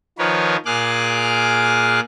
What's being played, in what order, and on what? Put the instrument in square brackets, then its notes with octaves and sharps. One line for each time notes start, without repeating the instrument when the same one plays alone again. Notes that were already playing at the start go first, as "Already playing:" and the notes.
[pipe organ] D#3 F3 A#4 B4 C#5
A#2 G#4 D6 F6 F#6